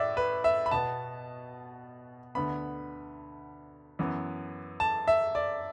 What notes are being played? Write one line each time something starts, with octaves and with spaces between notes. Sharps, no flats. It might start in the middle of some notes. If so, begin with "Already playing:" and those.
Already playing: A2 D5 E5
B4
E5
B5
B2 B3 A5
D2 D3 B3 B5
F#2 E3 B3
A5
E5
D5